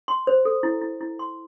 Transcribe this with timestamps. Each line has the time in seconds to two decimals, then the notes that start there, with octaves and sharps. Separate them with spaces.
0.08 C6
0.27 C5
0.45 A4
0.63 E4
0.82 E4
1.01 E4
1.19 C6